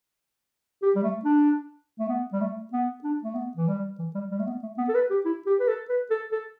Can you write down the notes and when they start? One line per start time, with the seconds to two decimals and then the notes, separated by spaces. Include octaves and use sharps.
0.83 G4
0.96 G3
1.03 A3
1.25 D4
1.99 A3
2.09 B3
2.33 G3
2.41 A3
2.73 B3
3.04 D4
3.24 A3
3.35 B3
3.57 E3
3.68 G3
3.99 E3
4.15 G3
4.31 G3
4.39 A3
4.47 B3
4.63 A3
4.78 B3
4.89 A4
4.95 B4
5.11 G4
5.25 E4
5.46 G4
5.60 B4
5.68 A4
5.89 B4
6.10 A4
6.32 A4